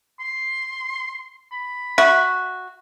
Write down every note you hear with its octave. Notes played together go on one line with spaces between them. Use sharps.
C6
B5
F#4 E5